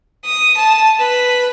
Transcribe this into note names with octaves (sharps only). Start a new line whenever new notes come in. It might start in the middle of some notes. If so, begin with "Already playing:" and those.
D#6
A5
B4